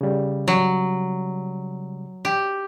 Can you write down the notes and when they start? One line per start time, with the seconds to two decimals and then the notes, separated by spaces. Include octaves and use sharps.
0.01 C#3 G3
0.48 F#3
2.25 G4